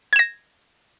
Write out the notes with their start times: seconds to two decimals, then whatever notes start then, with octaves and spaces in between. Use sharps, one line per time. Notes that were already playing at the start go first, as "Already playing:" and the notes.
0.13 G#6
0.16 E7
0.19 A#6